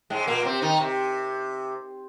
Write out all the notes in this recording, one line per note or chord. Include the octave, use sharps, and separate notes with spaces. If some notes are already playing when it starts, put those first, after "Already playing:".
G#2 G#3
A#2 A#3
C3 C4
D#3 D#4
C3